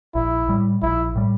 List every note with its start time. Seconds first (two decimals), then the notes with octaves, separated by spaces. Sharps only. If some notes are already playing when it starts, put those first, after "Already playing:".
0.15 A#1 E4
0.48 A2 G3
0.82 A#1 E4
1.15 A2 G3